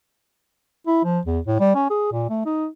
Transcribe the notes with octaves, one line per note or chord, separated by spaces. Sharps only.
E4
F3
E2
A2
G3
C#4
G#4
A#2
A3
D#4